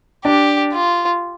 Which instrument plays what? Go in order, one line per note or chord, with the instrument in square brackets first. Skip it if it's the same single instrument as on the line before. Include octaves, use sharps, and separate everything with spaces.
[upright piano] D4 [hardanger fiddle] G4
[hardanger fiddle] F4